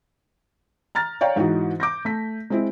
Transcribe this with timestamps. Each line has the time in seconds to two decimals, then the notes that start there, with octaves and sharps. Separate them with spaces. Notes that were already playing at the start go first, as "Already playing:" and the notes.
0.95 A#5 F6 A6
1.21 C#5 D5 F5 G5 A#5
1.36 G#2 E3 D#4 F#4
1.80 D6 G6 A#6
2.05 A3 B6
2.50 G#3 C4 E4